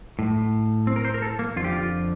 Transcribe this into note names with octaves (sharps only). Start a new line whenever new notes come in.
A2
C4
A#4
C5
A#4
A4
A#3
F2 D3 F4 G4
F4